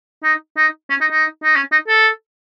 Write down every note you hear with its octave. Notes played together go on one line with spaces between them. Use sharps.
D#4
D#4
C#4
D#4
D#4
D#4
C#4
D#4
A4